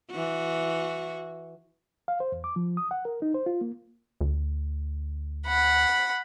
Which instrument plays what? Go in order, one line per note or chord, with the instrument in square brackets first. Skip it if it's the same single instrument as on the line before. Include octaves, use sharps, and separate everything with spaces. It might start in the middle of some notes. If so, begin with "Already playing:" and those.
[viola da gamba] E3 F#4
[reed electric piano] F5
C5
E2
D6
F3
D#6
F#5
A#4
D#4
C5
F4
A#3
[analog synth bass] D2
[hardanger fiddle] F#5 B5